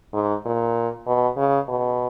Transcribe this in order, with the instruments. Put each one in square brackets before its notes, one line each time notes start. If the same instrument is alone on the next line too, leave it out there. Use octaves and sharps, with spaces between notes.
[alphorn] G#2
A#2
B2
C#3
B2